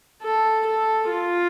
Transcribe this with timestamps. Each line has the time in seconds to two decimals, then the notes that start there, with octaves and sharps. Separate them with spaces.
0.23 A4
0.66 A4
1.10 F4